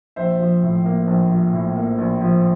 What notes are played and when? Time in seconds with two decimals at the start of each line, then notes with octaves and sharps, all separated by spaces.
0.16 A#1 C5 E5
0.40 F3
0.63 A2
0.86 A#3
1.07 A#1
1.30 F3
1.53 A2
1.77 A#3
1.98 A#1
2.21 F3